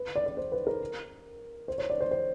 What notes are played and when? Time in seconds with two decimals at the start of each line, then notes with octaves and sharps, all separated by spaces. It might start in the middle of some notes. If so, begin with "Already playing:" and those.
Already playing: B4
0.16 D5
0.26 D5
0.37 C5
0.52 B4
0.67 A#4
1.68 C5
1.78 C#5
1.90 D5
2.01 C5
2.11 C5